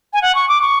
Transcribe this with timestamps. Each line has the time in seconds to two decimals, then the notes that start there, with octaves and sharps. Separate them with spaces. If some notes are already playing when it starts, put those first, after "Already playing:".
0.13 G#5
0.22 F#5
0.35 C#6
0.49 D6
0.62 C#6